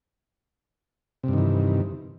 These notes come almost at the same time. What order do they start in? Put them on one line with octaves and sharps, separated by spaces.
C3 G2 D#3 E3